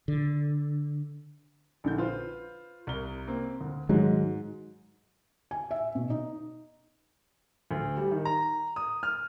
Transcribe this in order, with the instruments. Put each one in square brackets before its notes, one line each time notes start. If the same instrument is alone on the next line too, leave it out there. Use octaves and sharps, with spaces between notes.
[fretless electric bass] D3
[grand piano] A#1 D3 G6
F4 B4 C5
C2 A#4 G7
A#3 C4
D2
[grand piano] G#2 [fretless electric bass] D#3 F#3 G#3
[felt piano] G#5
E5
B2
D#4
[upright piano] D2
G3
D#3
A#5
D#6
F6